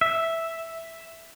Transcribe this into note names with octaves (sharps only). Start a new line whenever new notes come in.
E5